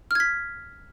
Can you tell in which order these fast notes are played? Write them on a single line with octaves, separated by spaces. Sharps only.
F6 G#6 B6